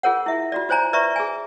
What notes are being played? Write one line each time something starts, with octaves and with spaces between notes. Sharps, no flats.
F4 G#4 A#4 C#5 F#5
E4 E5
F4 F#4 D5
F4 C5 C#5 G#5 A#5
B4 D5 E5 A#5 C#6
G#4 G#5